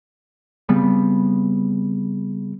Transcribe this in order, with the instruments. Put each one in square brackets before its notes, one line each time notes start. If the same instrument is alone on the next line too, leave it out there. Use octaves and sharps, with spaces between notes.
[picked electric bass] C#3 G3 B3 C4